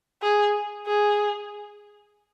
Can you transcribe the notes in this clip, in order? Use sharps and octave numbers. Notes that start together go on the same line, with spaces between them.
G#4
G#4